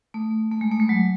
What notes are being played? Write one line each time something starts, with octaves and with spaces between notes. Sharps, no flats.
A3
A3
G#3
A3
G#3
F#3